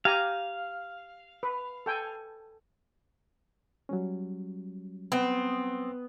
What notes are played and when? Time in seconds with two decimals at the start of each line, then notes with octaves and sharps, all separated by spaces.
0.05 G4 F5 G#5 A#5
1.43 B4
1.86 A4 G5 G#5
3.89 F#3 G3 C#4
5.12 B3 C4